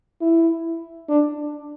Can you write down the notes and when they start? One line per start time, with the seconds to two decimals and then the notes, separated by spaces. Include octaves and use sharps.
0.21 E4
1.09 D4